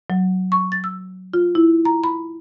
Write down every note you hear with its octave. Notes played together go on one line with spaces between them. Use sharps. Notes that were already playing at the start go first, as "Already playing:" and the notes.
F#3
C#6
A6
E6
F4
E4
A#5
B5